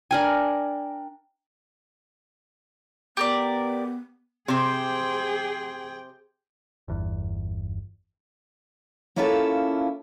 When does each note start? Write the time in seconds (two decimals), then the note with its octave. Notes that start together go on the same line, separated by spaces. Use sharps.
0.11 D4 A#4 G5 G#5
3.17 B3 G4 A#4 D5
4.48 C3 C4 G#4 G5
6.88 G1 E2
9.16 A#3 C#4 E4 F4 G4 A4